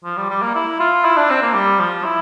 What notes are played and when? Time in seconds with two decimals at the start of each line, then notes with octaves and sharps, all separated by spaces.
0.04 F3
0.17 G3
0.29 G3
0.42 A#3
0.55 E4
0.80 F4
1.05 E4
1.17 D4
1.30 C4
1.42 A#3
1.54 G3
1.79 F3
2.05 E4